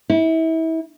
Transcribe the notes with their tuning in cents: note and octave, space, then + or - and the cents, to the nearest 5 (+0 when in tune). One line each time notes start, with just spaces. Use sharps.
E4 -30